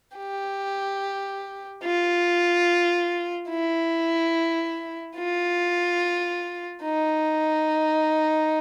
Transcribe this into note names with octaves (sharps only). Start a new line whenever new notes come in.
G4
F4
E4
F4
D#4